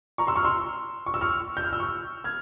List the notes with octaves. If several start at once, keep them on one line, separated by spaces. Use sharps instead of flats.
A#5 C#6
C6 E6
C#6 F6
C6 E6
C#6
E6
C#6 F6
G6
F6
E6
C#6 F6
F6 G#6